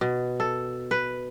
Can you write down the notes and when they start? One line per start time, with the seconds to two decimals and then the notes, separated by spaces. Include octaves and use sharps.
0.01 B2
0.40 A4
0.91 B4